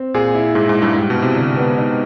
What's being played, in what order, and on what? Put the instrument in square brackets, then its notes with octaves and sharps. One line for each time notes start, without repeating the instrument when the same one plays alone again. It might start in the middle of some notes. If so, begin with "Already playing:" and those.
Already playing: [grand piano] C4
[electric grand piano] A#2 [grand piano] G#4
[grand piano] E4
[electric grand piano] G#2 [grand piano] G#4
[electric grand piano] G#2
[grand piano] E4
[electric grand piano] G2
[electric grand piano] G#2 [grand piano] G4
[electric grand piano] B2
[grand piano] E4
[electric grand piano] C3
[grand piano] D3
B3
D#4